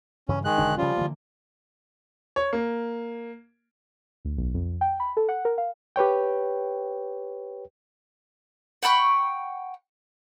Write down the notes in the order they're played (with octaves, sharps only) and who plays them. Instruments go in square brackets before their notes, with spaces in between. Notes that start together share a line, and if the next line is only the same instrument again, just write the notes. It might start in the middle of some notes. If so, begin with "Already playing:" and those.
[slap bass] G2 C#3 E3 [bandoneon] C#4
[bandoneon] D#3 G#3 F#6
[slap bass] E1 D3 D4
[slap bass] C#3 C#4 [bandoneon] F3 G3 F4
[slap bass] D3 E3 A#3
[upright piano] C#5
A#3
[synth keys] D2
B1
F2
G5
B5
A4
F#5
A#4
F5
[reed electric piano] G4 B4 C#5 G5
[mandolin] F#5 G5 B5 C#6